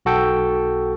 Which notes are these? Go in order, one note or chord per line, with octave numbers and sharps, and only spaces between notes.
B1 F#4 A4 G5